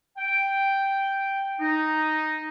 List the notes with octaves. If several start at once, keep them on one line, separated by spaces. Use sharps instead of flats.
G5
D#4